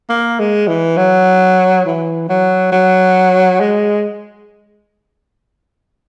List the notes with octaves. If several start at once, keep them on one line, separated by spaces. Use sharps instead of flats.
A#3
G#3
E3
F#3
E3
F#3
F#3
G#3